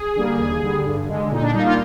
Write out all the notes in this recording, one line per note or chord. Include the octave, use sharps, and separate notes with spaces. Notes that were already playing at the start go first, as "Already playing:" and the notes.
Already playing: G#4
D3 G3 A#3
D#2
D3 G3
G2
D3 G#3
A#2 D#4
D4
G3 A#3 D#4
F4